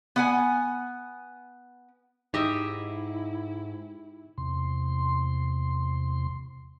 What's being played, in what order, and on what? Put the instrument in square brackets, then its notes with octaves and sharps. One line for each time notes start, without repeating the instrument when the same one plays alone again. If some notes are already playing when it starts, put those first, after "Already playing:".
[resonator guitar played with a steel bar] B3 F#5 G#5
[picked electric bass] G#2 [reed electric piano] D#4 [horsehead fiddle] E4 [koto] G4 D#5 E5
[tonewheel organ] E2 C3 C6